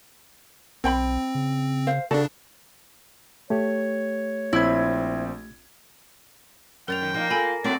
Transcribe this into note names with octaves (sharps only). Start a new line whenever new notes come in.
B1 C4 C5 G5 B5
C#3
C5 F5
C#3 D4 F#4 A4 D5
A3 G4 C#5
A#1 C4 E4 G#6
F#2 A#4 G5 A6 F7
D#3
F3 A#3 D#4
F4 A4 G#5 B5
A2 F#3 C4 F#4 C5 D5